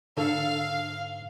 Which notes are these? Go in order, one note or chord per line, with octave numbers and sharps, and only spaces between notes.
G#2 D3 A4 F5